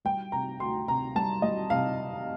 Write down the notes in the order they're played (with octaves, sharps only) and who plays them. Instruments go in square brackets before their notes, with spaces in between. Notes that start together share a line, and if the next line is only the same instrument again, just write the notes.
[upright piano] G3 G5
C3 A#5
D2 C6
C3 A#5
G3 A5
G3 D#5
C3 F5